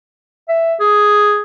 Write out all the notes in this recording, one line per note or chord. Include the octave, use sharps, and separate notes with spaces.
E5
G#4